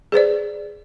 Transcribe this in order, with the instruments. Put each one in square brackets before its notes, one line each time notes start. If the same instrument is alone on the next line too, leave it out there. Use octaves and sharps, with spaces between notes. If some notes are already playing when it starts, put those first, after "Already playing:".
[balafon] G#4 B4 C5 D5